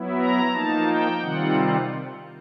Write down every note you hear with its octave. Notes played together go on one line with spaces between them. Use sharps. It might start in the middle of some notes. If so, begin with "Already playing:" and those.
Already playing: F#3 B3 E4
A#5
F3 A#3 D#4 A5
G5
C3 D#3 G3 C4 F4 F#5